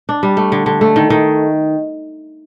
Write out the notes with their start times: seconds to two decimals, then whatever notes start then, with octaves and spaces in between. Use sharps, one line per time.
0.09 D4
0.23 G3
0.37 A3
0.52 D3
0.66 D3
0.81 A3
0.96 D#3
1.10 D#3